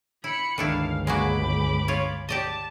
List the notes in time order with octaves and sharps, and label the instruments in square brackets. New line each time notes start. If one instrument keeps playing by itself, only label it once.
[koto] E4 [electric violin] B5 C#7
[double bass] G1 C#2 [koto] D#3 D4 E4 [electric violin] F5
[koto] G#3 A#3 F#4 [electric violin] B5 D6
[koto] F4 C#5
[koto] G4 D5 D#5 [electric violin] A5